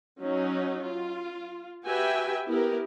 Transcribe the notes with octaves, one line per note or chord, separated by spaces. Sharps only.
F#3 C#4 D#4
F4
F#4 G4 B4 E5 G5 G#5
B3 E4 G4 A#4